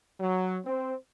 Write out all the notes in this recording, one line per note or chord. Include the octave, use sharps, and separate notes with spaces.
F#3
C4